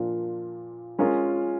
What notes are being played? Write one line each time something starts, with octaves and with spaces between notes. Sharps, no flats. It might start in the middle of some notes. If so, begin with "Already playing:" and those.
Already playing: A#2 F3 A#3 D4 F4
G#3 C#4 F4 A#4